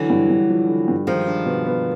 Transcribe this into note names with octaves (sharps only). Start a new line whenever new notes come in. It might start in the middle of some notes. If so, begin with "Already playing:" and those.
Already playing: D3 E3 F#3
G2
G2
F3
D3
G2
D#3 F3 G#3
D4
B2
B3